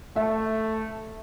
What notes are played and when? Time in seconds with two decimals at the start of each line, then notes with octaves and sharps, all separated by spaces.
0.16 A3 E5